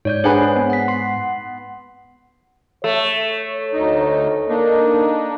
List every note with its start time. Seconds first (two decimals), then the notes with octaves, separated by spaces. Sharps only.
0.05 G#2 C#5 D5 G6
0.24 D4 G#4 B4 C5 F#5 G#5
0.56 B3
0.70 F#5 B6
0.88 C6 C7
2.84 A3 C#5
3.73 D2 D#4
4.49 A#3 D4 D#4